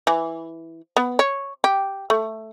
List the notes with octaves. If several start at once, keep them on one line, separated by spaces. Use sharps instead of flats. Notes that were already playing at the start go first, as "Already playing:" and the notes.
E3
B3
C#5
G4
A3